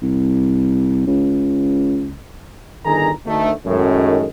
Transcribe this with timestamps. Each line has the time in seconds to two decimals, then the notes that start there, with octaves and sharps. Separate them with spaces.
0.02 C2
1.07 C#2
2.85 G1 D#3 G#4 A4 A#5
3.26 D2 D#3 A3
3.65 F#2 A2 D#3 G#3